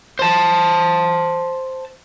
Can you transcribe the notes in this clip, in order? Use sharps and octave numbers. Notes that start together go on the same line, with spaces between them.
C5 A5